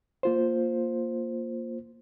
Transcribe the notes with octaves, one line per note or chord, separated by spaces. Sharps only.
A#3 F4 C5